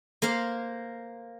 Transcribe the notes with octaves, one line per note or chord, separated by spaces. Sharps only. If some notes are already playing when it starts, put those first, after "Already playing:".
A#3 C5 F5